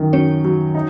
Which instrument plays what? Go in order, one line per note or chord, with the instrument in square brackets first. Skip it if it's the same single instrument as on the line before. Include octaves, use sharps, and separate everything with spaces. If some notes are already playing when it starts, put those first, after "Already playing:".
Already playing: [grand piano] F#2 D#3
[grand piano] F#3 [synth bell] C#4 C#5
[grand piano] F#3
D#4